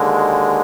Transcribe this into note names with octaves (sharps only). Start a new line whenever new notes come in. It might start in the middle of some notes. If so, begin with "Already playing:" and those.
Already playing: D#2 D3 G#3